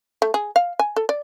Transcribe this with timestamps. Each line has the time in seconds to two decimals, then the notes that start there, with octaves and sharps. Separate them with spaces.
0.22 A3
0.34 G#4
0.56 F5
0.79 G#5
0.96 A4
1.09 D5